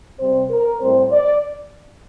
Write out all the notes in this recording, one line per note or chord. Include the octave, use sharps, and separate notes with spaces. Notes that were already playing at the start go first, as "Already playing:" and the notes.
C3 G3 C4 C5
A#4
A2 G3 C4 C5
D5